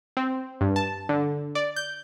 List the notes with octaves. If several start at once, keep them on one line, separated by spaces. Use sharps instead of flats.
C4
G2
A5
D3
D5
G6